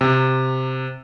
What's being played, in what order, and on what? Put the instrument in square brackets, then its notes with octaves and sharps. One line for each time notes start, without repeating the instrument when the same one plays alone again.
[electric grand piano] C3